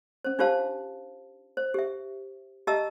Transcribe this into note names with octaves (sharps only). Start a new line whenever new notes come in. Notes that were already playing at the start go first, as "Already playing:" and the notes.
C#4 C5
D4 F4 G4 C5 F5 A5
C5
G4 E5
G4 D#5 E5 A5 A#5 E6